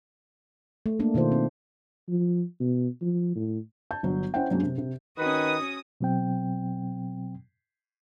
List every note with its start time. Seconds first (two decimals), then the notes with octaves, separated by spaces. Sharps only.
0.86 A3
0.99 A3 A#3 D4
1.14 B2 D#3 F4 C5
1.32 C4
2.09 F3
2.60 B2
3.01 F3
3.35 A2
3.91 A5 G6
4.03 G1 F#3
4.34 C#4 E4 C5 F#5 G5
4.51 F#2 F#3 G#3 A#3 C#4 D4
4.63 C3
4.78 C3
5.18 D#3 C#4 F#4 B4 D#6
6.01 B2 F#3 C4 G5